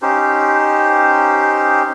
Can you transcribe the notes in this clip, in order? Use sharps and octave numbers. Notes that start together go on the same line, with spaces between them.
C#4 D#4 G4 C5